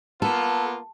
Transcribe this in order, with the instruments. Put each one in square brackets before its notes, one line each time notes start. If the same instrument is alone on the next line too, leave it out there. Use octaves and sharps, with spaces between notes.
[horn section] A#3 B3 F4 [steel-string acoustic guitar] A4